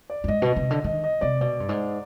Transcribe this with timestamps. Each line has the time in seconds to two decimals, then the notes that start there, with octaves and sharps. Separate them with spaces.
0.10 D5
0.24 G2
0.28 G#2 D#5
0.42 B2
0.56 C3
0.71 D3
0.84 D#3 D#5
1.04 D#5
1.21 C3 D5
1.41 B2 D5
1.60 G2
1.69 G#2